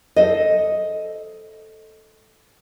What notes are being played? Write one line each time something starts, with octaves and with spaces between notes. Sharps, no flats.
A4 C5 D#5